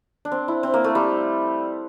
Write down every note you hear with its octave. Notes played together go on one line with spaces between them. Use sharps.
D4
C4
E4
C4
A#3
A3
G3